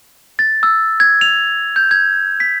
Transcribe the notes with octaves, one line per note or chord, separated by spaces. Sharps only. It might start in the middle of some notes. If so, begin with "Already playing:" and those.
A6
E6
G#6
F7
G6
G#6
B6